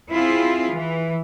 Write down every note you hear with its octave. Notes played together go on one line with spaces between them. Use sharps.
C4 E4 F4 G#4
E3